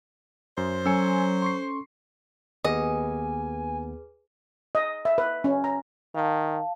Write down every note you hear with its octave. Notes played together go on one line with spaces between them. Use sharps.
F#2 C5
F#3 C#4 A4 G#5 C6 E6 C#7
C6 C#6 C7
D#2 B3 G#4 B4 D#5 G#5
D#5
E5
B4
C#4
A#5
D#3 F5 A5